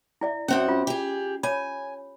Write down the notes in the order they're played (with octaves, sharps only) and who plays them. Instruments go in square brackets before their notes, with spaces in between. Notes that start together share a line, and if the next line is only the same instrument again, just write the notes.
[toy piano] E4 D5 E5
[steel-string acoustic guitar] F#2 C4 F#5 [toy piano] C#4
[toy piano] F4
[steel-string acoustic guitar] G4 G#4
[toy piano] C#5 B5 [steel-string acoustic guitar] G#5